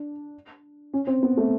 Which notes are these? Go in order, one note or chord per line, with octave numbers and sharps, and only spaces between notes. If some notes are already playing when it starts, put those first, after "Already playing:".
Already playing: D4
C#4
C4
B3
A3